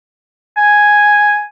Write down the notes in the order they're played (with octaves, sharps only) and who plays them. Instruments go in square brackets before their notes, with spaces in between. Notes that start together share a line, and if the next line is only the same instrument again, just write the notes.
[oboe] G#5